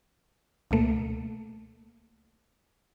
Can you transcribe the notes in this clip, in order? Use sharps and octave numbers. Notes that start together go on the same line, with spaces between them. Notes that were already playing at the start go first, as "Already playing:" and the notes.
C#2 B2 A3 A#3